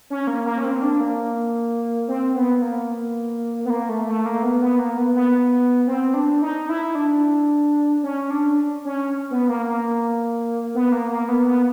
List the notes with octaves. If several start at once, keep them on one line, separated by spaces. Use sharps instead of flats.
C#4
A#3
A#3
C#4
C4
D4
A#3
C4
B3
A#3
B3
A#3
A3
A3
A#3
B3
B3
A#3
B3
B3
C4
D4
D#4
E4
D4
C#4
D4
C#4
B3
A#3
A#3
B3
A#3
A#3
B3
B3